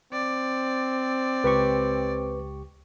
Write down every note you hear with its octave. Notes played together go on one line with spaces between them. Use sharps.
C4 D5
C#2 G4 B4 C#6